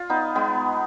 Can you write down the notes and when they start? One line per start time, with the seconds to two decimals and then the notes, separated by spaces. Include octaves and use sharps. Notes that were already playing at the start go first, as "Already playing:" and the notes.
Already playing: F4
0.10 B3 D#4
0.35 G#3 B3